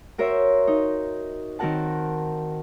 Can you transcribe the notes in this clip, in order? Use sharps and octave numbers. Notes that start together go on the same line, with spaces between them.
F#4 A#4 C5 C#5 E5
D#4
D#3 C4 F#4 A#4 F#5 A5